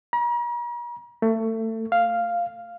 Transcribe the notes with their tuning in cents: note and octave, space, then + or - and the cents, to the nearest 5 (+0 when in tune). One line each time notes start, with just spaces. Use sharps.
A#5 +45
A3 +25
F5 -5